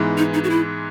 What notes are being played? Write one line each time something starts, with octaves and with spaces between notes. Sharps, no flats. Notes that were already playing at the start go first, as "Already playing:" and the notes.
Already playing: G#2 E3 G#3 B3
D#4
D#4
F#4
E4